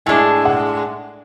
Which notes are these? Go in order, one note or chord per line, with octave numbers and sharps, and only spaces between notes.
A2 G#3 D4 G#5
F#5